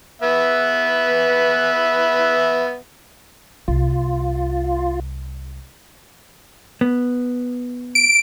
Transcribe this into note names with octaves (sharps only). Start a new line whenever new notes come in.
B3 B4 E5
C2 F4
B3
D7